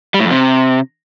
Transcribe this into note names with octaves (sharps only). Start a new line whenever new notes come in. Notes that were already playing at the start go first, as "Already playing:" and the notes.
G3
A2
F2
C3